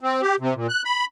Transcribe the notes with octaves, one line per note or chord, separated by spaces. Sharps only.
C4
G4
C3
A#2
F#6
B5